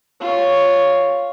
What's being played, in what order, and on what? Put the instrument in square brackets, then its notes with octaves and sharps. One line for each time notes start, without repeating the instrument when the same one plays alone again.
[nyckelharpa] F4 C#5